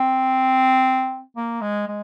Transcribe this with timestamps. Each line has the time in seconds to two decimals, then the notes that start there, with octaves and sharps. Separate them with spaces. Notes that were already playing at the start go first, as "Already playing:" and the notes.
Already playing: C4
1.37 A#3
1.61 G#3
1.88 G#3